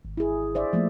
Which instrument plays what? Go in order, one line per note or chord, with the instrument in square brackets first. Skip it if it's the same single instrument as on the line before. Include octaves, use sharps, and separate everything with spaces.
[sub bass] G#1
[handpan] E4 G#4
C5 D5 E5
F3 A3 A#3